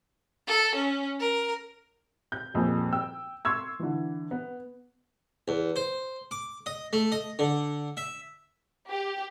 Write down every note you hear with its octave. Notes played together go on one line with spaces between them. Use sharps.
A4
C#4
A#4
G6
D#1 F2 A#2 G#4 G#5
G5 E6
C6 C#6 E6 G#6
D3 E3
B3
E2
C5
D6
D#5
A3
D#5
D3
E5
G4